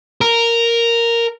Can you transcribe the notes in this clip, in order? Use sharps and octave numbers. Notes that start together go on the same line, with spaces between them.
A#4